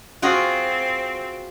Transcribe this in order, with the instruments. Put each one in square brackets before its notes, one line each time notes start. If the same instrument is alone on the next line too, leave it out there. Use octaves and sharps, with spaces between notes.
[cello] C4 [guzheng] F4 F#4 G#4